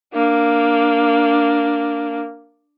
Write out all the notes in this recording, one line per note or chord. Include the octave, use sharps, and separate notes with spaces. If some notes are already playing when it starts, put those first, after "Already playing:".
A#3 D4